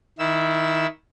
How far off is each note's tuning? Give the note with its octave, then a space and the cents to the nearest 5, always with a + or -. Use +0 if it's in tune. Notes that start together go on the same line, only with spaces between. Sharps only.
D#3 +20 E4 +0 E6 +0